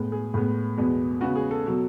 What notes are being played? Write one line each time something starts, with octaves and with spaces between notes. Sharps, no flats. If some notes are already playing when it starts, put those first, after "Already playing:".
Already playing: A2 G#3 B3
G#4
A2 G#3 B3
E2 B2 G#3 B3
C#3 G#3 B3 F#4
G#4
A4
B2 F#3